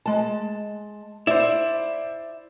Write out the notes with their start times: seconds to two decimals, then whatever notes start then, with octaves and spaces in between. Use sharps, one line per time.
0.06 G#3 A5
1.27 E4 C5 D5 E5